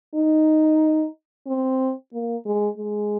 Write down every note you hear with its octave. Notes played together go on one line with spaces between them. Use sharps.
D#4
C4
A#3
G#3
G#3